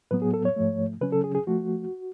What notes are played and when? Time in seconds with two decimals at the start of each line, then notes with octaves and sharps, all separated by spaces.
0.11 A2 F#3 B3 B4
0.22 G#4
0.34 A4
0.45 C#5
0.56 G#2 F3 A3
1.01 C#3 F#3 C#4 B4
1.12 A4
1.24 G#4
1.35 G#4
1.47 F3 A3 F#4